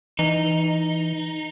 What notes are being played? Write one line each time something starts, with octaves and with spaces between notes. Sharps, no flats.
E3 D#4